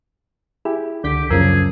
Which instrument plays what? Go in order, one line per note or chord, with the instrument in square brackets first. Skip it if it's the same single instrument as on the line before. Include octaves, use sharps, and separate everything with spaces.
[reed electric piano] E4 G4 [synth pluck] G#4
[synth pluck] C#2 G6 B6 [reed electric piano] D3 [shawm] G4
[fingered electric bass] F#2 [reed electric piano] C#3 F3 E6 [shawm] G#4 [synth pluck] A#4